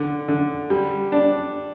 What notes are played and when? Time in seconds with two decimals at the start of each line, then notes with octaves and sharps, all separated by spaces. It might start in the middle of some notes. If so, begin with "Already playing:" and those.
Already playing: D3
0.28 D3
0.70 G3
1.12 D4